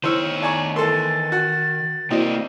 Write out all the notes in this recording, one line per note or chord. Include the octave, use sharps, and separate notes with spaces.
D#3 E4 C5 C#5 E6 F6 D#7
D5 G#5 A#5 C#6
E3 A4 A#4 C6 A6
F#4
C2 A#3 C4 E4 F#4 D5 D#5